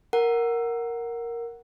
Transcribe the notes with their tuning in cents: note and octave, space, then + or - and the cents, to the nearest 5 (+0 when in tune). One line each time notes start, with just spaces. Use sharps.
A#4 +0 F#5 +0